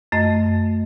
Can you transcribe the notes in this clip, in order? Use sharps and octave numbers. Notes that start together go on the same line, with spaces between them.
F#2 A3 D#5